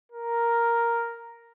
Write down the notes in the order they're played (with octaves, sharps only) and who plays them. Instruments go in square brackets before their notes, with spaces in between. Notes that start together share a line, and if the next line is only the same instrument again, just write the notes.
[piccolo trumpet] A#4